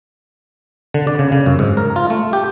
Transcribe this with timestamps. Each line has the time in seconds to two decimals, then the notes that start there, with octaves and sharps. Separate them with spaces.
0.94 D3
1.07 D5
1.19 C#3
1.32 C#3
1.46 F#2
1.59 G#2
1.77 A#4
1.96 F4
2.10 A3
2.33 G4